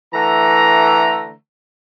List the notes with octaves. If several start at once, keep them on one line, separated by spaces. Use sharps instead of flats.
D3 E3 A3 A#5